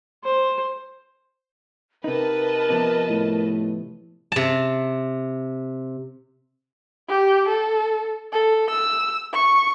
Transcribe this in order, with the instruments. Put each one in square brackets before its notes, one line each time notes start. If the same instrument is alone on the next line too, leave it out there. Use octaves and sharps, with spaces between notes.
[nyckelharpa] C5
[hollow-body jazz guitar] C3 D#4 [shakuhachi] A#4 [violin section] B4 D#5 A5
[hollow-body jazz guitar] C3 F3 B3
[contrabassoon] A2
[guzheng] C3 A5
[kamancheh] G4
A4
A4
E6
C#6